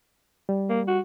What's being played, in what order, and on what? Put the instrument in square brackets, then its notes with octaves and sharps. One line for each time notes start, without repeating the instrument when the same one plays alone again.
[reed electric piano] G3
[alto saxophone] A#3
F#4